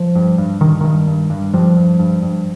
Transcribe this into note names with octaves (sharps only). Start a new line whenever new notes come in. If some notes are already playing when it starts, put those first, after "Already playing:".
Already playing: F3
G2
G2
G2 D#3
G2 D#3
G2
G2
G2 F3
G2
G2
G2